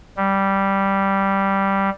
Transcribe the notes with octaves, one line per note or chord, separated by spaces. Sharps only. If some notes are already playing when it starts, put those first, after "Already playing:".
G3